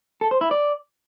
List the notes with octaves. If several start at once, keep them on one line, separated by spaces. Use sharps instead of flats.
A4
C5
E4
D5